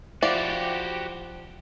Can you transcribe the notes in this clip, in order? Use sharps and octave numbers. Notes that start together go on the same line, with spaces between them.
F3 E4 F#4 G4 D5